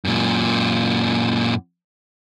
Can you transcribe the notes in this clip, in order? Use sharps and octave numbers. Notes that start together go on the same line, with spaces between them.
F#2 A#2